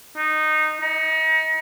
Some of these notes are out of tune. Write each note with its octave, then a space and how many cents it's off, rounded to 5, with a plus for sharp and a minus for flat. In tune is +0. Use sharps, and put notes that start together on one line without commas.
D#4 -10
D#4 +30